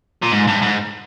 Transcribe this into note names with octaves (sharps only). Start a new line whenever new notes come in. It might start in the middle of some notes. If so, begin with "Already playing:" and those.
A#2
G#2
G2
G#2